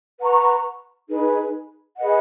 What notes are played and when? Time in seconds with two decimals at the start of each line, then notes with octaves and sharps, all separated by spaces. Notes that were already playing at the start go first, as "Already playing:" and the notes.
0.19 B4 F#5 A#5 C#6
1.09 D#4 G#4 B4
1.97 G#4 B4 D#5 F#5